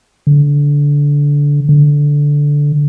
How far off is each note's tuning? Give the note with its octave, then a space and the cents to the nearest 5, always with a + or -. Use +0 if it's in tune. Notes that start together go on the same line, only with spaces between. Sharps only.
D3 -20
D3 -10